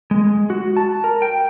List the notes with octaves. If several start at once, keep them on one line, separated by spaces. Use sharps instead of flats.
G#3
F#4
A5
A#4
G5